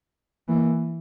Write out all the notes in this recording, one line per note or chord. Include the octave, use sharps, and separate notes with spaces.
E3 A#3